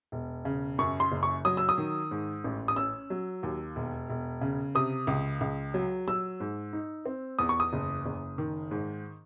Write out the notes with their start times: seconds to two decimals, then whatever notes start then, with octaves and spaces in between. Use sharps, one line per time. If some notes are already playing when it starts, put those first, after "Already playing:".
0.12 E1
0.45 C#3
0.78 F#2 C#6
1.00 C6
1.12 F#1
1.23 C#6
1.45 F#3 D#6
1.57 E6
1.69 D#6
1.78 D#3
2.11 G#2
2.44 A1
2.68 D#6
2.76 C#4 E6
3.10 F#3
3.43 D#2
3.76 E1
4.09 E1
4.41 C#3
4.75 C3 D#6
5.07 C#2
5.41 C#2
5.74 F#3
6.08 F#3 E6
6.40 G#2
6.73 D#4
7.06 C4
7.39 E2 D#6
7.49 C#6
7.60 D#6
7.73 F#1
8.06 F#1
8.38 D#3
8.71 G#2